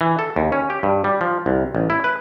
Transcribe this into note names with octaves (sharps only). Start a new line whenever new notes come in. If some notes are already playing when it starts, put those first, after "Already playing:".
E3
A4
D#2
C#4
G4
G2
G3
F3
C2
A1
E4
B4